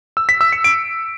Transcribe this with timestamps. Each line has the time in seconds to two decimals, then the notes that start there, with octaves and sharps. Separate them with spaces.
0.17 E6
0.29 B6
0.41 E6
0.52 C#7
0.64 D7